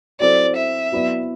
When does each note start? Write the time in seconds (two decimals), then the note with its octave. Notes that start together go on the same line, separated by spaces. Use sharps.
0.20 F#3 C4 E4 A4 C5 D5
0.56 E5
0.92 F#3 B3 E4 B4 D5